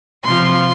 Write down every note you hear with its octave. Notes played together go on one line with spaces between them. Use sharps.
C3 C6
F3